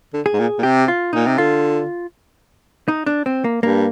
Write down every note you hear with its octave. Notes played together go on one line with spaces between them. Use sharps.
D3
G#4
G#2
A#2
A#2
C3 G4
F4
A#2 D#4
C3
D3 F4
D#4
D4
C4
A#3
G2 A#3